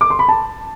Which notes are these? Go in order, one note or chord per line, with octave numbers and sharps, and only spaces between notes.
D6
C6
B5
A5